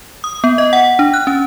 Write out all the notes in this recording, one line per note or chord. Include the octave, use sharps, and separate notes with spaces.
D#6
B3
D#5
F#5
D4
F#6
C#4